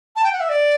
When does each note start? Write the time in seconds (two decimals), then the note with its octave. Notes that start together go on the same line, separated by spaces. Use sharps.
0.16 A5
0.24 G5
0.33 F#5
0.40 E5
0.49 D5